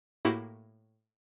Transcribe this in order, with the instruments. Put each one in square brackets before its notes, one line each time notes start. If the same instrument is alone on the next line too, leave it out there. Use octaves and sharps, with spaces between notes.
[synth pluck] A2 A#3 E4 F#4 G4